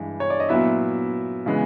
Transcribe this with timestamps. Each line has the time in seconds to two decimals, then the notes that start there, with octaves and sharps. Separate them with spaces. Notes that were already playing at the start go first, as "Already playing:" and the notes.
Already playing: G2 E3 G#3
0.20 C#5
0.30 D5
0.40 D#5
0.49 A#2 F#3 B3 E4 E5
1.46 C#3 E3 G#3 B3